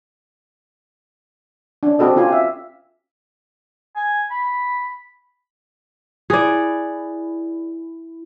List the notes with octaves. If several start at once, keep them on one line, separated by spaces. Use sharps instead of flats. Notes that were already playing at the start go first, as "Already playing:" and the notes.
C#4 D4
C4 F#4 G4 A4 D#5
C#4 F4 G4 G#5
E5 F5
G#5
B5
E4 G#4 D5